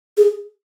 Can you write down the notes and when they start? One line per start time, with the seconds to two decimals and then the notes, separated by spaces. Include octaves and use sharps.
0.17 G#4